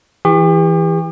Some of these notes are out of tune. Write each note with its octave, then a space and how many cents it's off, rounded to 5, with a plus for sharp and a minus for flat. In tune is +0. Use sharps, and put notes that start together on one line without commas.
E3 +0 G4 +40 C#6 +0